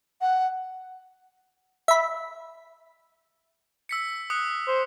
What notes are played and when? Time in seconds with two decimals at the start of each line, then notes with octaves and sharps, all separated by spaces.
0.21 F#5
1.88 E5 B5
3.89 E6 B6 C#7
4.30 D#6 F#6 C#7
4.68 C5